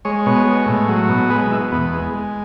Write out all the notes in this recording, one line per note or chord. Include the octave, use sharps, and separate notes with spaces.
G#3 C#5
B2 C#5
G#3
A2
F#3
B2
G#3 B4
B2 E4
E2 B3
G#3
G#3